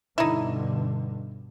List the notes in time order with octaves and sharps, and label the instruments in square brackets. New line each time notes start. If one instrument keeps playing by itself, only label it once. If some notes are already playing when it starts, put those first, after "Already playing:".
[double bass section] G2 B2 D3 [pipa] D#4 E4